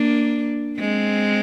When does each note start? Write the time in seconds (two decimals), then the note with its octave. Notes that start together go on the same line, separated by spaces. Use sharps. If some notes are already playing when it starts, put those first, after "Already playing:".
Already playing: A#3 D4
0.79 G#3 C4